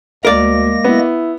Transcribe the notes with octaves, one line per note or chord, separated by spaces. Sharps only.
D2 G#3 A#3 A#4 D5 A#6
B3 E4